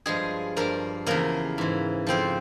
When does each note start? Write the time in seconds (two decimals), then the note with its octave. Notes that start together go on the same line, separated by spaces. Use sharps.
0.06 G2 F3 G#3 G#4
0.57 G2 F3 A#3 A#4
1.06 E2 C#3 F3 A#3 A#4
1.58 G#2 E3
2.07 F2 C#3 F3 C4 C5